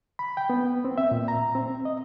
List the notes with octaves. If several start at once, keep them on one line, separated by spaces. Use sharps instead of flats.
B5
G5
B3
C4
E5
A#2
A#5
C4
D#5